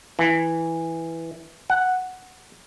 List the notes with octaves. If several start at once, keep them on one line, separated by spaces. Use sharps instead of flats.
E3
F#5